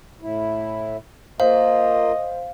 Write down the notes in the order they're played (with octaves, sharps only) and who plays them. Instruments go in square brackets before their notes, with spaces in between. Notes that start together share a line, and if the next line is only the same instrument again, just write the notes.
[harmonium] A2 E4
[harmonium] A#3 F4 [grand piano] C5 [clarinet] D#5 [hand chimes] F5